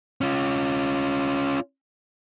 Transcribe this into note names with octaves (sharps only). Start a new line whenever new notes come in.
C#4 F4